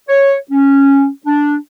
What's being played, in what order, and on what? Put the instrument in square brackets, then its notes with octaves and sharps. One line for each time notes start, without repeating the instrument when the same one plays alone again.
[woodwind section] C#5
C#4
D4